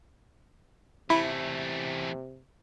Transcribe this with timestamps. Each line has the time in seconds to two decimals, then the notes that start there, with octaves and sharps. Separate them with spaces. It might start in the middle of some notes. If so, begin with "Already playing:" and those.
1.10 E2 C3 A3 E4 B5